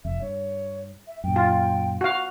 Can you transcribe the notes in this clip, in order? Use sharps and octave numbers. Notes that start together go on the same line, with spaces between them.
F1 F2 E5
G2 C#5
E5
F#2 A#2 G5
F4
F#4 F5